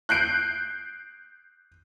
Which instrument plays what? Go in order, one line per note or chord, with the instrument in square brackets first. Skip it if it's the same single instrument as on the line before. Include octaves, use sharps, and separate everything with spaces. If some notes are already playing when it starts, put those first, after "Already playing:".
[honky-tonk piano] F#6 G6 C7 D7